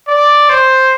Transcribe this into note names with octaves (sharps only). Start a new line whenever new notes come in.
D5
C5